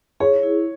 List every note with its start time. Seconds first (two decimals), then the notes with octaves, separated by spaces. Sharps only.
0.20 G#4 C#5
0.43 E4